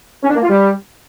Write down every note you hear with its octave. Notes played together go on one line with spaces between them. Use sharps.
C#4
D4
A#3
F4
G3